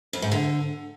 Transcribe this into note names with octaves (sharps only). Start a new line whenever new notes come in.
F2
G#2
D3